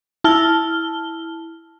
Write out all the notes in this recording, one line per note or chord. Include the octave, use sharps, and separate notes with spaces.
E4 A5 F6 G7